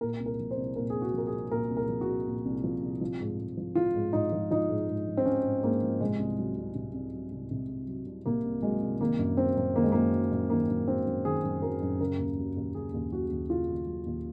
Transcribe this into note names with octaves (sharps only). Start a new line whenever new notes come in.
A#2 A#4
C2
A#4
F3
C5
C2
A#2 A#4
C2 G#4
F#4
F3 A#4
G#4
C2
A#2 A#4
C2
A#4
F3
F#4
C2
A#2
C2
F3
C2
F3
G#2
G#2
F3
F3 F4
G#2
G#2 D#4
F3
F3 D#4
G#2
G#2
F3
C4
F3 C#4
G#2
G#2 A#3
F3
C3 G#3
C2
F#3
C2
C3
C2
F#3
C2
C3
C2
F#3
C2
C3 A#3
C2
F#3 G#3
C2
D#3 A#3
F#2
F#3 C4
F#2
D#3 A#3
G#3
F#2 A#3
F#3
F#2
D#3 A#3
F#2
F#3 C4
F#2
D#3 G#4
F#2
F#3 A#4
F#2
C#3 A#4
D#2
F#3
D#2
C#3 G#4
D#2
F#3 F#4
D#2
C#3 F4
D#2
F#3
D#2